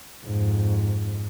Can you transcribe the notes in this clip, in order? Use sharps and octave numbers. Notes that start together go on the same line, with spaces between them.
F2 G#2